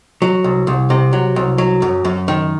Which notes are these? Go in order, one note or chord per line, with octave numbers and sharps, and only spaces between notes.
F#3
C2
C2
C3
F#3
C2
F#3
F#2
F#2
D#3